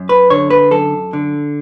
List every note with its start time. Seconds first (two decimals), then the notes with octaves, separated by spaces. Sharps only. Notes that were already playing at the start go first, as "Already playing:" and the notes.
Already playing: F#2
0.09 B4
0.30 D3 C#5
0.50 B4
0.71 F#2 A4
1.13 D3